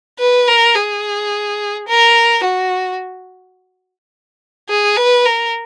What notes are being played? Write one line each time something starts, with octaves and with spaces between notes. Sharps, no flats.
B4
A#4
G#4
A#4
F#4
G#4
B4
A#4